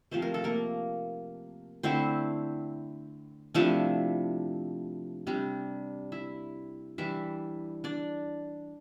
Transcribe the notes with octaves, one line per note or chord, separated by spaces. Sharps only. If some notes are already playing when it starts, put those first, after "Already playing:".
C3 F3 A3 C5
A#4
A4
A#3 A#4
D3 A3 C4 E4 C5
C3 F3 A3 D4 E4 E5
C3 G3 D4
E4 E5
E3 G3 D4 E4 E5
D4 D5